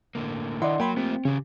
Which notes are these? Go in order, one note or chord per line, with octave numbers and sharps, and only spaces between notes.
A2 D3 A#3
D#3 D4 E4 D5 D#5 F#5 C6
F#3 A#3 G5 B5 C6
A3 C4 F4 G4
C#3 C#4 G4